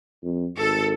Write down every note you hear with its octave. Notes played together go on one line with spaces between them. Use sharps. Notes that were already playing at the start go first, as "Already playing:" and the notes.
F2
G#1 A4